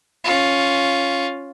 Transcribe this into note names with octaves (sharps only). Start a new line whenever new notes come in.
C#4 F4